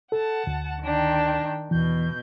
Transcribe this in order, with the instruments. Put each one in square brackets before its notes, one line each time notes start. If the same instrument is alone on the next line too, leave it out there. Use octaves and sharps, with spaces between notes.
[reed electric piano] A4 [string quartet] F#5 A5
[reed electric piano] D2
[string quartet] D#3 D4 G5
[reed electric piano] E2 E3 [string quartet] B2 G6